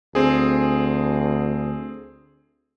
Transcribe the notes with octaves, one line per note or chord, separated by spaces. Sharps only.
D2 C4 G#4